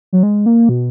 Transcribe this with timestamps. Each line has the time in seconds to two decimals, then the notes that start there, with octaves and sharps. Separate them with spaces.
0.13 F#3
0.23 G#3
0.46 A#3
0.69 B2